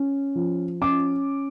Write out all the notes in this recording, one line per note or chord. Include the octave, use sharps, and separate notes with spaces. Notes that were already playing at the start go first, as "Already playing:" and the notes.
Already playing: C#4
F3
C#4 D6